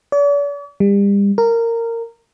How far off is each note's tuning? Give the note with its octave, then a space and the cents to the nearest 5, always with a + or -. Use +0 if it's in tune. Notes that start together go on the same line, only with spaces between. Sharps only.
D5 -45
G3 +35
A#4 -15